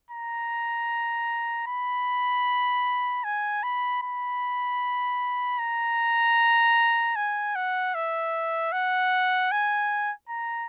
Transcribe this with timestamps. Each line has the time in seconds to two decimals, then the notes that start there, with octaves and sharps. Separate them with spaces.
0.11 A#5
1.67 B5
3.24 G#5
3.64 B5
4.03 B5
5.59 A#5
7.16 G#5
7.56 F#5
7.95 E5
8.72 F#5
9.52 G#5
10.29 A#5